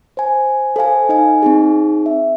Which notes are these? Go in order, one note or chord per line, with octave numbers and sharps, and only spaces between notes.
C5 G#5
A4 C5 F5 G#5
D#4 D#5 G#5
C4 D#4 G#4
E5